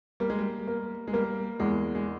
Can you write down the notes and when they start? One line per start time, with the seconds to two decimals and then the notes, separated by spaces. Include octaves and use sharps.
0.20 G3 A#3
0.30 G#3
0.39 G3
0.67 A#3
1.07 G#3
1.13 G3 A#3
1.60 E2 G#3
1.95 G#3